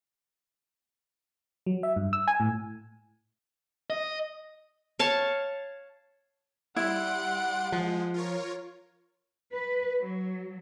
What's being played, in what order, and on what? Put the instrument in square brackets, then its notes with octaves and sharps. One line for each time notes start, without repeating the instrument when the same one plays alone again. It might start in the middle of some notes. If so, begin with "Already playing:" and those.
[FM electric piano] F#3
E5
G2
E6
G#5
A2
[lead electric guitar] D#5
[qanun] C#5 F5 A5
[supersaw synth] G3 C6 D7 [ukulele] E4 [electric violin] F#5
[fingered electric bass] F3 [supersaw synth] G#3
[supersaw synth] F4 A#4 C#5
[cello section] B4
F#3